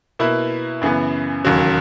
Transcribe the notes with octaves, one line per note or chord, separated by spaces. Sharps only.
B2 A#3 E4 B4
F#2 C#3 E3 B3
E1 D#2 C#3 F#3